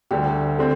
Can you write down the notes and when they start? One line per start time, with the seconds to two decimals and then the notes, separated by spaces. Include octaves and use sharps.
0.11 D2 D3 G3 G4
0.59 D3 C4